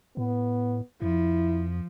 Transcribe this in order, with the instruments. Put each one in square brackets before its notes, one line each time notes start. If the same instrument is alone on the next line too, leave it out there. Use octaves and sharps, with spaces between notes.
[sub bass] A2 [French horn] B3
[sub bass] F2 [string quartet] F3 [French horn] E4